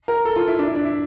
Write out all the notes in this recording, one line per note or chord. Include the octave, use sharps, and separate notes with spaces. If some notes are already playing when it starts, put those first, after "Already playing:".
A#4
A4
F4
E4
D4
E4
D4
E4